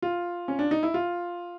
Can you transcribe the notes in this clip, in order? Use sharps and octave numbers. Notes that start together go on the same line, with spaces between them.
F4
C#4
D4
D#4
E4
F4